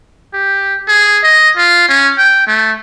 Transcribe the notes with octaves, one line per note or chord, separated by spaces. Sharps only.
G4
G#4
D#5
F4
C#4
G5
A3